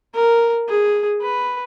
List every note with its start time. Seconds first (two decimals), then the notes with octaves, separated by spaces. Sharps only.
0.14 A#4
0.68 G#4
1.22 B4